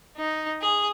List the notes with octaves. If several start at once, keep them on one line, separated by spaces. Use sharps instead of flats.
D#4
G#4